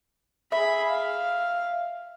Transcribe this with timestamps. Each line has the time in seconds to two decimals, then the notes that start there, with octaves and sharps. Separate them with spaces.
0.52 G#4 E5 B5
0.89 F5